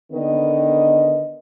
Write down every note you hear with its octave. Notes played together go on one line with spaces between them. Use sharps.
D3 D#3 B3 A#4 D5 D#5